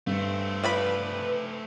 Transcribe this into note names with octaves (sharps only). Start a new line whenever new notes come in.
G2 A3 C4
F3 B4 D5 B5